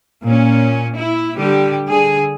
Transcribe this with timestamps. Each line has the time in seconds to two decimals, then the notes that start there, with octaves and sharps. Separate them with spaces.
0.23 A#2 C#4
0.95 E4
1.37 D3 G3 G4
1.88 D3 G#4